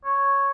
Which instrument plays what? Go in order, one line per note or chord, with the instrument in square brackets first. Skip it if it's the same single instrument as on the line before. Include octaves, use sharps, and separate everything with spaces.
[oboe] C#5